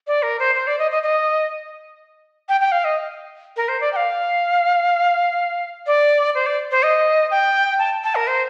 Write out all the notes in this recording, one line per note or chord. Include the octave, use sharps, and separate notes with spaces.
D5
A#4
C5
C5
D5
D#5
D#5
D#5
G5
G5
F5
D#5
A#4
C5
D5
G5
F5
D5
C5
D5
C5
D#5
G5
A5
A5
A#4
C5